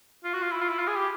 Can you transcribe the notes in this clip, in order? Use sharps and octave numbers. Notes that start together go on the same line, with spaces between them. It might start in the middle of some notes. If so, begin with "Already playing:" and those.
F4
F#4
F4
E4
F4
E4
F4
G#4
G4